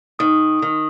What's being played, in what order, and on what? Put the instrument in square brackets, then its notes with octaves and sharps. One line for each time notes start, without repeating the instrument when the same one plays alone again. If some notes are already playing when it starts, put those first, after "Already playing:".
[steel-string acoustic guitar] D#3 [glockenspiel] D#6
[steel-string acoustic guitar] D#3